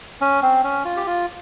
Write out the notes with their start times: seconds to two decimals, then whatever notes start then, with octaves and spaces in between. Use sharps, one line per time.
0.21 C#4
0.42 C4
0.64 C#4
0.85 F4
0.97 G4
1.07 F4